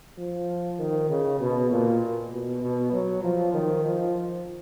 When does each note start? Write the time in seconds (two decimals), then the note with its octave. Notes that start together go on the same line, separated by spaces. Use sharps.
0.18 F3
0.79 D#3
1.10 C#3
1.40 B2
1.71 A#2
2.32 B2
2.62 B2
2.93 F#3
3.23 F3
3.54 D#3
3.84 F3